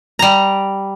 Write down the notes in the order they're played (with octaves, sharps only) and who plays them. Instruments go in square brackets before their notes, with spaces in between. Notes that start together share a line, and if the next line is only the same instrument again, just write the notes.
[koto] G3 A#5